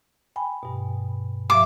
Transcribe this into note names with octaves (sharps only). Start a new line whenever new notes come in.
G5 G#5 B5
G2 B2
G2 F3 E5 D6